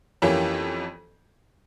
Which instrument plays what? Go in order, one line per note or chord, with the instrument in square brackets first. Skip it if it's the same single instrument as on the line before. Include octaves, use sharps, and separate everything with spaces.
[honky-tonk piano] F2 E3 A#3 C#4 G4